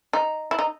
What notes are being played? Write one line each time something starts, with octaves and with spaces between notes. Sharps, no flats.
D#4
E4
D#4